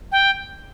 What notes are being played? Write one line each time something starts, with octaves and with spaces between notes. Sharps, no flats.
G5